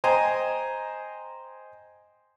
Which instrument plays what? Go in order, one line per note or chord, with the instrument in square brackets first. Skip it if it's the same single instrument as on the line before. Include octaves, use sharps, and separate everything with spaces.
[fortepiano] C5 D#5 G5 G#5 A#5